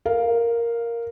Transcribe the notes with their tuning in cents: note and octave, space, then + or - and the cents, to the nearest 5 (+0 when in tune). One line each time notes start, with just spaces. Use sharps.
A#4 +0 F5 +0